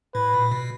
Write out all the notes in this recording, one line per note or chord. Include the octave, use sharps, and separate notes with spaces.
A2 B4
A#2
B2